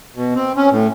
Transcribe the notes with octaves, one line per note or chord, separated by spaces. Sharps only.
B2
C4
C#4
A2